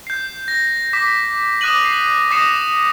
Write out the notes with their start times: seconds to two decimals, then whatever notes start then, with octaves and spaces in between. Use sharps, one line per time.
0.07 G6 C7
0.48 A#6
0.93 D6 B6
1.61 D6 D#6 F#6 A#6 D#7 F#7
1.85 C7 F#7
2.31 D6 D#6 A#6 C7 C#7 E7